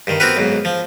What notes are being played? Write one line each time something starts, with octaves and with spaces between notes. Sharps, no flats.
G2 D#3
B3 C4 F#4 A#4 B4
B1 G#2
F3